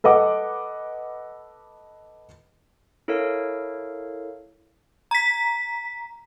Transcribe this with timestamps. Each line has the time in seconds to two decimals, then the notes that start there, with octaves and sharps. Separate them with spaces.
0.04 A4 B4 D#5 F#5 D6
3.08 E4 A4 A#4 C#5 F5
5.11 A#5 B6